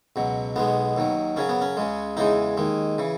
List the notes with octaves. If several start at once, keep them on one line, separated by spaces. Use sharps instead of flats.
C#2 B2 F#3
B1 B2 G#3 B3
D#2 D#3 F#3
F#2 C#3 F#3 C#4
B3
C#4
C#2 C#3 G#3
E2 C#3 E3 G#3 D#4
D#2 D#3 G#3
C#3 E3